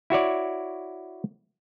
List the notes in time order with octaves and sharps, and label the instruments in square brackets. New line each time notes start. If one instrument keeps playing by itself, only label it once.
[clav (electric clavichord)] E4 F#4 C#5 D5